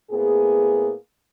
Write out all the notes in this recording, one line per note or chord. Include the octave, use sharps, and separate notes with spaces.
A2 A#3 B3 G#4